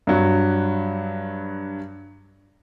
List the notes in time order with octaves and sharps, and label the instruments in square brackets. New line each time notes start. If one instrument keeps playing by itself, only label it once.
[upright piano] G2 F#3